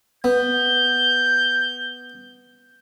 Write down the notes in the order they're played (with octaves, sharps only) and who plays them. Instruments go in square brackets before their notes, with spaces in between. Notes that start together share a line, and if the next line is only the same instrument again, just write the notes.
[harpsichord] B3 [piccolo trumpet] G6